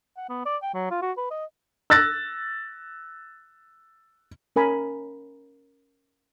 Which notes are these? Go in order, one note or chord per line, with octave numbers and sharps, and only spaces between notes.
F#5
B3
D5
G5
F#3
F4
F#4
B4
D#5
E6 F#6 A6 A#6
C#4 A#4 G#5 B5